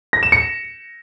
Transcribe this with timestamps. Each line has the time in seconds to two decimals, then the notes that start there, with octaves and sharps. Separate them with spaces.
0.13 A#6
0.23 E7
0.32 C#7